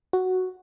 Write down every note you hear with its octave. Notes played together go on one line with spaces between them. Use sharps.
F#4